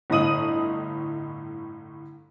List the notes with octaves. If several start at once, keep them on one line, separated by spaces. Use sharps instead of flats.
G1 A2 D#5 D#6 D#7 F#7